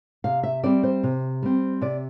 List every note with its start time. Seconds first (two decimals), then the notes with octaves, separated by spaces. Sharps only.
0.24 C3 F5
0.43 E5
0.63 G3 C4 D5
0.83 C5
1.03 C3
1.42 G3 C4
1.81 C3 D5